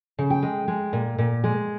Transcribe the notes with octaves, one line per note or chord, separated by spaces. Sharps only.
C#3
G5
G#3
G#3
A#2
A#2
G#3